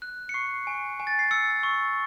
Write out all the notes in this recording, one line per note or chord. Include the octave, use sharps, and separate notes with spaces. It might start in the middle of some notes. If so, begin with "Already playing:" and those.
F#6
C#7
C#6 C7
G#5
G#5
A6
C7
E6 C#7
C#6